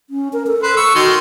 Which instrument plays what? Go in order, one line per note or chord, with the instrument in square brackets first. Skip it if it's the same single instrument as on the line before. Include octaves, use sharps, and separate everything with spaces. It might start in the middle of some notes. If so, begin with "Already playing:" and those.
[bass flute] C#4
A#4
A4
[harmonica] B4 C5
C#6 E6
[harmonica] D#3 C6 [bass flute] F#4